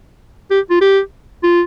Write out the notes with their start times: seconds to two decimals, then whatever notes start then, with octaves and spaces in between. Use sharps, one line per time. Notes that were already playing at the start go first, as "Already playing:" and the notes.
0.50 G4
0.70 F4
0.81 G4
1.43 F4